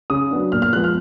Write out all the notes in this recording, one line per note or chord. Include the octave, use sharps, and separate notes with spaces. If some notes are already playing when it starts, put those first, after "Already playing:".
C#3 D#6
F#3 B3 D4
A#2 F6
F6
F3 G#3 B3 F#6
F6